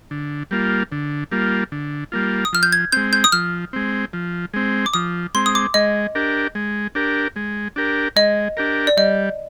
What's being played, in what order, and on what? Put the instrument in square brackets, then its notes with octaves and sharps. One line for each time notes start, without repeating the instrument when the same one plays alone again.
[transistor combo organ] D3
G3 A#3 F4
D3
G3 A#3 F4
D3
G3 A#3 F4
[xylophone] D#6
[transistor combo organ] F3 [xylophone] F6
[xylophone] G6
G#6
[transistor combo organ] G#3 C4 [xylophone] G6
[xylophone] G6
D#6
[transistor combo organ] F3 [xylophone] F6
[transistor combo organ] G#3 C4
F3
G#3 C4
[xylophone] D6
[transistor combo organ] F3 [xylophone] D#6
[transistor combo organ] G#3 C4 [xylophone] C6
[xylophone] D#6
D6
[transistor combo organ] G#3 [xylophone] D#5
[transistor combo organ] D4 G4 A#4
G#3
D4 G4 A#4
G#3
D4 G4 A#4
[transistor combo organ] G#3 [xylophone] D#5
[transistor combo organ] D4 G4 A#4
[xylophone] D5
[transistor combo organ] G3 [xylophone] D#5